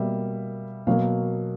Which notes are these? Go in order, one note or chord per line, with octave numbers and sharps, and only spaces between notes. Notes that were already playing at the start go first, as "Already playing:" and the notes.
Already playing: B2 G3 A#3 E5
B2 F#3 A#3 F5